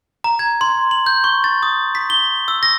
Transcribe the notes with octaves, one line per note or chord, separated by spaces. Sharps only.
A#5
G#6
C6
F#7
G6
C#6
A6
D#6
B6
G7
E6
A#6